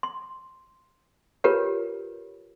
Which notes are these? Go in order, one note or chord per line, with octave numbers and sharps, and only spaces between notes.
C6
F4 G4 A#4 B4 C#5